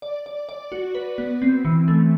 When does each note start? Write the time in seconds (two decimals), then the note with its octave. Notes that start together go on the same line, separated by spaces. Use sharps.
0.02 D5
0.26 D5
0.49 D5
0.72 F#4
0.95 B4
1.18 B3
1.42 C4
1.65 E3
1.88 A3